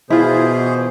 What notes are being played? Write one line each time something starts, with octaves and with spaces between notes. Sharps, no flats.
B2 E3 E4 F4 G#4 C5